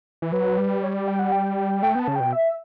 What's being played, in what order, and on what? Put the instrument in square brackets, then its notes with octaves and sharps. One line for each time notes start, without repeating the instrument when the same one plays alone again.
[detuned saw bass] E3
[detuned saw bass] F#3 [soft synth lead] B4
[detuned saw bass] G3
[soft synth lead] C#5
D5
G5
F#5
G5
[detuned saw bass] A3 [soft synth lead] G5
[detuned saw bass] B3 [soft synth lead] A5
[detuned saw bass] C#3
[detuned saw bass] B2 [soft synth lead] G5
[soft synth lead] E5